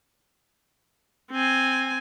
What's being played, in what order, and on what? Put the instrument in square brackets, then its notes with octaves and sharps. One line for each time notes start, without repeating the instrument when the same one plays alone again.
[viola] C4 G#5